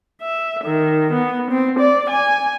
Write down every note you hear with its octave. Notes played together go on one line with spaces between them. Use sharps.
E5
D#3
B3
C4
D5
G#5